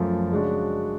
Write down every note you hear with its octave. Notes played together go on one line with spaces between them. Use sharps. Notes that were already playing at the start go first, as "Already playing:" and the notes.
Already playing: F#2 F3 A3
C#3 G#3 D4 F#4